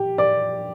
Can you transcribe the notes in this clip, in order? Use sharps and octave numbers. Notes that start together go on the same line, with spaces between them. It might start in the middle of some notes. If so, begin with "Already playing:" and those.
Already playing: G4
D5